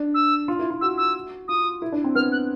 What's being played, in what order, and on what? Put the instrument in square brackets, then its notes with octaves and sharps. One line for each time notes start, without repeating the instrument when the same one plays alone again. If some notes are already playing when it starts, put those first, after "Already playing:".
Already playing: [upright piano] D4
[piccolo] E6
[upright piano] F4
E4
F4
[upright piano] F#4 [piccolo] E6
[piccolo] E6
[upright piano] F4 [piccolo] D#6
[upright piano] E4
D4
C4
[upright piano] B3 [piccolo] F6
[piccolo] F#6